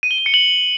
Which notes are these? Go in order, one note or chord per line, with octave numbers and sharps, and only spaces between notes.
D#7
G7
D#7
C#7
F#7